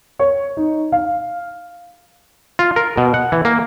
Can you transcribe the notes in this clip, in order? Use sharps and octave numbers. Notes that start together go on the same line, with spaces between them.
C#5
D#4
F5
F4
A#4
B2
F#5
E3
A#3